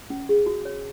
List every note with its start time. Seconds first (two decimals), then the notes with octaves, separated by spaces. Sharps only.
0.10 C#4
0.29 G#4
0.46 F#4
0.65 C#5